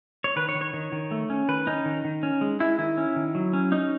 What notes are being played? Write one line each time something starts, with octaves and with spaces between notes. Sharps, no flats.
C#5
D#3 B4
C#5
D#3
C#5
D#3
D#3
A3
C#4
D#3 B4
C#4 D#4
D#3
D#3
C#4
G#3
G#3 E4
D#3 E4
C#4
D#3
F#3
C#4
C#4 D#4